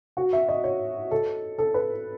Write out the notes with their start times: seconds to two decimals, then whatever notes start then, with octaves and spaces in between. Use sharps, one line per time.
0.17 F#4
0.33 E5
0.49 D#5
0.64 C#5
1.11 A4
1.58 A4
1.74 B4